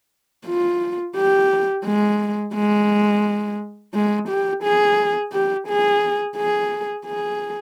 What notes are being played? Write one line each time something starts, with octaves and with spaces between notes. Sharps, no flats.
F4
G4
G#3
G#3
G#3
G4
G#4
G4
G#4
G#4
G#4